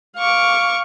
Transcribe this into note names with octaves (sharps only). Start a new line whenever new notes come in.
F5 C#6 D6